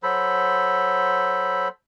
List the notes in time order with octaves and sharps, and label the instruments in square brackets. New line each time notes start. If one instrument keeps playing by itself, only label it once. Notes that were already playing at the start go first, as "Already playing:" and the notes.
[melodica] F#3 A4 C5 B5